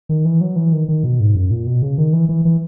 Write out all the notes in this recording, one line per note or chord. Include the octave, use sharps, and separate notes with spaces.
D#3
E3
F#3
E3
D#3
D#3
B2
G#2
F#2
A#2
B2
C#3
D#3
E3
E3
E3